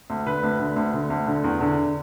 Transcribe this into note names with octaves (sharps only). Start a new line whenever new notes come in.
D2
D3 B4
D2
D3
D2
D3
D2
D3
E2
D3